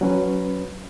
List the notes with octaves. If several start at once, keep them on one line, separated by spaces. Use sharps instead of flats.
F#3 C#4 B4